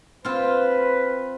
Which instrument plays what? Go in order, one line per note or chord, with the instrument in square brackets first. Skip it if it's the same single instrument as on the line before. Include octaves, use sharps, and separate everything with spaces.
[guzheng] C4 F4 [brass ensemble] B4